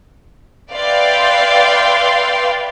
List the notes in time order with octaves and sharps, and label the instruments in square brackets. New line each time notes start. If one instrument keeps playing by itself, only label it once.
[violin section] B4 D5 E5 F5 G5 C6